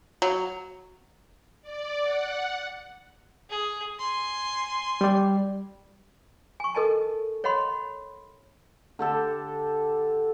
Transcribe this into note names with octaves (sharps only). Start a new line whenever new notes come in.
F#3
D5
F#5
G#4
G#5 C6
G3 D5
G#5 C#6
A4 A#4 D#5 G#5 A5
C#5 D#5 F#5 B5 C6
D3 G4 A4